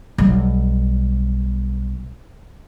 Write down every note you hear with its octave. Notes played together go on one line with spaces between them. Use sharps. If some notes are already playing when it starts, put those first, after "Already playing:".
B1 G3